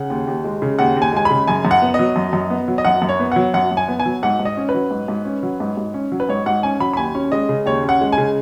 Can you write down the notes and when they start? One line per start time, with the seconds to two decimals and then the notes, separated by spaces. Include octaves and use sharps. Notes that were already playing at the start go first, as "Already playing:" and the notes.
Already playing: C#3 F#5
0.10 D#2
0.27 D#2
0.44 G#3
0.62 C#3
0.79 D#2 F#5
0.97 D#2
1.02 G#5
1.13 G#3 G#5
1.25 C#3 B5
1.47 F#2 G#5
1.65 F#2
1.71 F#5
1.82 B3
1.94 D#5
1.99 F#3
2.16 F#2
2.33 F#2
2.50 B3
2.68 F#3
2.78 D#5
2.85 F#2 F#5
3.02 F#2
3.09 C#5
3.20 B3
3.32 F#3 F#5
3.54 F#2 F#5
3.71 F#2
3.77 G#5
3.88 B3
4.00 G#5
4.05 F#3
4.23 G#2 F#5
4.39 G#2
4.45 D#5
4.57 C#4
4.69 B4
4.74 F#3
4.91 G#2
5.08 G#2
5.25 C#4
5.43 F#3
5.60 G#2
5.77 G#2
5.94 C#4
6.12 F#3
6.20 B4
6.29 G#2 C#5
6.46 G#2 F#5
6.63 C#4 G#5
6.80 F#3 B5
6.93 B5
6.97 D#2 G#5
7.15 C#4
7.32 G#3 D#5
7.49 C#3
7.66 D#2 C#5
7.84 C#4 F#5
8.01 G#3
8.12 G#5
8.18 C#3